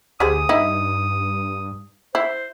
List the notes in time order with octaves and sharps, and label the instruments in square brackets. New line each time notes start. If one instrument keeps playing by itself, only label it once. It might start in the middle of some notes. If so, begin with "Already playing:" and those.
[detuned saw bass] D2 [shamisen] G4 G#4 C5 [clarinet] D#6
[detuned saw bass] G2 [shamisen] D#4 E4
[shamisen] E4 [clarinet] C5